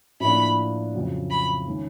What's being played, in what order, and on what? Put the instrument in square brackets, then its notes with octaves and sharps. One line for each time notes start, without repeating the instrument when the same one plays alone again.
[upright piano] A2 F3 A#3 D4 [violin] B5
[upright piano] F2 C#3 F#3
[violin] B5
[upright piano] D#3 G#3 C#4